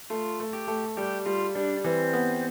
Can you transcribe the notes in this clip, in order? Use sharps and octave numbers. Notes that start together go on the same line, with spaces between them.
A3 F4
A3
G4
A3
G3 G4
G3 F4
G3 D4
E3 C4
B3